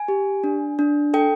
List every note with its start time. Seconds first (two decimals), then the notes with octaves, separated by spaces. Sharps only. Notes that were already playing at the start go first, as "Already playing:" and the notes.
Already playing: G#5
0.08 G4
0.44 D4
0.79 D4
1.14 A4 G5